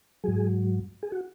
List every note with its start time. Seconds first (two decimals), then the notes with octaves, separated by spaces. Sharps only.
0.24 G#2 F#3 G#4
1.03 G#4
1.12 F#4